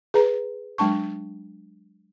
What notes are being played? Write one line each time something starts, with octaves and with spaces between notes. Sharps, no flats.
G#4 B4 A#5
F#3 G#3 D4 A5 C#6